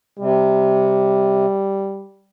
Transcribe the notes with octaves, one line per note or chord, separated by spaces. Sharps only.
C3 G3